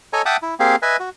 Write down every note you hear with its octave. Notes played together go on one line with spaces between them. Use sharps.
A4 C#5 D#5 G#5 A#5
E5 F#5 G5 A5 D6 D#6
E4
A#3 C4 G4 G#4 F5
B4 D#5 E5 G#5
F#4